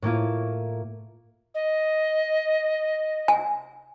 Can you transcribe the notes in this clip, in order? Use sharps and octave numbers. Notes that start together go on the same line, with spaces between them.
A2 A#3 E4 F4
D#5
G#5